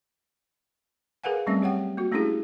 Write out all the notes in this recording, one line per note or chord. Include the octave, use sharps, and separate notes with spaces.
G#4 A#4 B4 F5 F#5 G#5
F#3 G3 A3 C4 C#4 E5
G4 C#5 F#5 G5
A#3 F#4
A3 C#4 D4 E4 G4 G#4